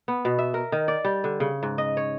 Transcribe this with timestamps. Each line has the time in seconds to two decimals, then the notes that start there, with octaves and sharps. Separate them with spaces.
0.08 B3
0.25 B2
0.39 E5
0.54 A#4
0.72 D#3
0.88 D5
1.05 G3
1.24 D3
1.40 C#3
1.63 G#2
1.78 D#5
1.97 C#5